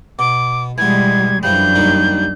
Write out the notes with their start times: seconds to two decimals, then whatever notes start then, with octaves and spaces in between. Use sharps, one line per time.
0.19 B2 D6
0.78 B2 E3 G3 G#3 G#6
1.43 F#2 E3 F3 G3 D4 G6
1.75 D#2 G3 D#4